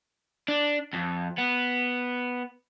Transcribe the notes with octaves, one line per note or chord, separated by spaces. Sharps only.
D4
F2
B3